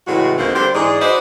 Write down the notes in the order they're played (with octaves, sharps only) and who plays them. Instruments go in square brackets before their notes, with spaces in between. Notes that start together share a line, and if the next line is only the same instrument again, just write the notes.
[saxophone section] A2 C#3 E3 G#3 F#4
D2 F3 A#3 C4 D#4 F#4
D3 G3 G4 C5
G#2 E3 G#3 G#4 D5
F#4 B4 C5 D5 D#5